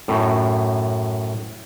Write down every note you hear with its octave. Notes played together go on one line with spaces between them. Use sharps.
F#2 A2